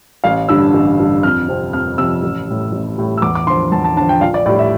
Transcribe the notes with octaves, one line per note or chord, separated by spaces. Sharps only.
A1 F5
G2 D3 E6
A1
G2 D3
F2 F6
C3 F3 C4
F2 F6
C3 F3 C4 E6
A1
A2 G3
A1
A2 G3
E6
E2 D6
D6
D3 F3 C6
E2 A5
A5
D3 F3 A5
G5
A#1 F5
D5
A2 G3 D5
E5